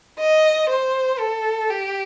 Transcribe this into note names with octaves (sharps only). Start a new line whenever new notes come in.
D#5
C5
A4
G4